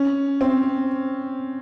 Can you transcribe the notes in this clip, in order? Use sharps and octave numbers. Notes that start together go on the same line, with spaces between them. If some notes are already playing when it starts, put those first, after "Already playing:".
Already playing: C#4
C4